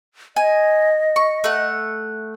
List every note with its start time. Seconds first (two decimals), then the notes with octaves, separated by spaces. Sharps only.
0.36 D#5 G#5
1.16 C#6
1.44 A3 F#5